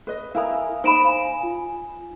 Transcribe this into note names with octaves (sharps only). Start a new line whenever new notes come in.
B4 D#5
E4 A#4 F5 G#5 A#5 D#6
D#4 C5 A#5 B5 D7 E7
F5 G#5
F4 G#5